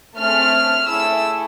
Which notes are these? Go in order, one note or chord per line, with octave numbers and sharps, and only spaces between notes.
A3 C4 G#4 F6
A3 E4 G#4 E6